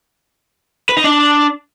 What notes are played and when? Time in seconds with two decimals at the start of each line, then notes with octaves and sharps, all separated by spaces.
0.89 B4
0.97 D#4
1.04 D4